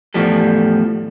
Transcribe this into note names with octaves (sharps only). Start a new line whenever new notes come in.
E2 A2 F3 G3 A4